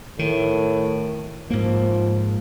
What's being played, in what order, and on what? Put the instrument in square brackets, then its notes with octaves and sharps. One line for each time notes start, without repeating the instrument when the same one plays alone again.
[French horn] A2 [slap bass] D#3
[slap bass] G#2 A#3 [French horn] F3